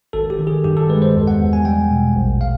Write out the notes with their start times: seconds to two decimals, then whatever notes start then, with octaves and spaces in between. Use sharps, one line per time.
0.13 G#1 A4
0.30 G4
0.39 D#3
0.47 G#4
0.64 G2 G4
0.77 A4
0.89 G#3 B4
1.02 C5
1.15 E2
1.27 F#5
1.40 E2
1.53 G#5
1.65 G3 G5
1.90 B2
2.15 A#1
2.41 F5